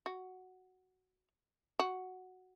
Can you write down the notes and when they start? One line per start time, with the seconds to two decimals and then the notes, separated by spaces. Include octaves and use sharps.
0.06 F#4
1.79 F#4